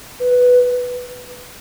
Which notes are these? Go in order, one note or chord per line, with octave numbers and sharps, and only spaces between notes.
B4